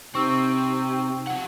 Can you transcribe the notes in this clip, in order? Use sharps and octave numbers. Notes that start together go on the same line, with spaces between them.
C3 C4 D#4 C#6 E6
F3 F#5